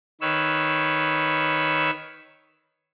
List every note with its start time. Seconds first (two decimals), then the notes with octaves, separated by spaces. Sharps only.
0.21 D#3 B4 C#5 E6